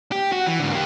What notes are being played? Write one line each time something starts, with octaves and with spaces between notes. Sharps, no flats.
G4
F#4
E3
G#2 D3
A#3 G4